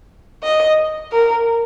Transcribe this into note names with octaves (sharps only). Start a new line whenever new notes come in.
D#5
A#4